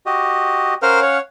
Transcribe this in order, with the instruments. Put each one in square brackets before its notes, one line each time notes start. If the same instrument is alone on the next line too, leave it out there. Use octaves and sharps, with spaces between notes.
[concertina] F#4 G4 D#5
[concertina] C#4 F5 F#5 [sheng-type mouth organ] A#4 C5 F6
[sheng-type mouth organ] C#5